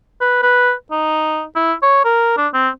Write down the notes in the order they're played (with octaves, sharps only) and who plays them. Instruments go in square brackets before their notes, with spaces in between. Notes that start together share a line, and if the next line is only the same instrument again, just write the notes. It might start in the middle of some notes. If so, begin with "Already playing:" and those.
[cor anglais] B4
B4
D#4
E4
C#5
A#4
D4
C4